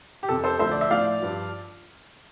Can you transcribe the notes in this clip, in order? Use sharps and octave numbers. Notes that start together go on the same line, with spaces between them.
G4
F2 C3 F3 A4
A4 C5
D2 D3 F3 C5 E5
D5
E5
A2 F3 D5 F5
G2 F3